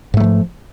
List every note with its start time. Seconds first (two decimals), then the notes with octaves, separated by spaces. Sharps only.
0.14 G#2
0.17 A3
0.20 F#3
0.24 F3